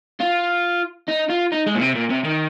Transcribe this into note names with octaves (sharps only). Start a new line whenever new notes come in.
F4
D#4
F4
D#4
G#3
A#2
C3
A#2
C3
D#3